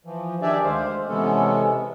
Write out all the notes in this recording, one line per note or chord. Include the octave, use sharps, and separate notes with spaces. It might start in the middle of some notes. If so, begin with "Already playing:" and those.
E3 F3
D#3 D4 G4 G#4 D5 E5
D2 G#3 C5 F5
C3 E3 G#3 B3 C#4 A4